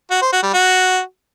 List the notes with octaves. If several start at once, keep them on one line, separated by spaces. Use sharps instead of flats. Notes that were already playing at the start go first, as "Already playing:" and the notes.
F#4
C5
F#4
G3
F#4